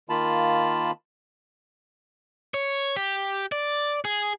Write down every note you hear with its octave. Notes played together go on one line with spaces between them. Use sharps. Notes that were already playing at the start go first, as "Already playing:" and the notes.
D#3 A#3 F4 A5 B5
C#5
G4
D5
G#4